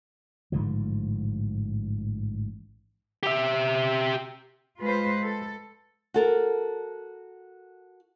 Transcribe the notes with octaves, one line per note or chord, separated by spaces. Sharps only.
A1 G#2 D3 F3
G4 E5
G#3 F4 B4 C5
A4
F#4 A4 A#4